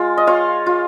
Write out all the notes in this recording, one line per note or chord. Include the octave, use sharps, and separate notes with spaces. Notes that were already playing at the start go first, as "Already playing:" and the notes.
Already playing: G#3 F4
D#5
F4 C#5 F5
F4